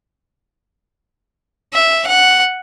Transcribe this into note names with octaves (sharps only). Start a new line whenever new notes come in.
E5
F#5